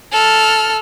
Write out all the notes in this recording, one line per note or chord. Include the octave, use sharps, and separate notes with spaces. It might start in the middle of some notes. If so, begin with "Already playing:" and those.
A4 F6